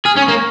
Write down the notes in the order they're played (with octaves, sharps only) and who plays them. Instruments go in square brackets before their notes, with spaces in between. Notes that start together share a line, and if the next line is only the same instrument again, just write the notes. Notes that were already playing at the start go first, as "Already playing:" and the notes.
[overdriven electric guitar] G#4 [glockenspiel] F6
[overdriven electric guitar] C#4
[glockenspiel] C#6
[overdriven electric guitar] A#3